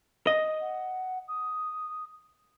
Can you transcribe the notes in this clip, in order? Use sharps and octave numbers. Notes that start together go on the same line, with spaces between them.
D#5
F#5
D#6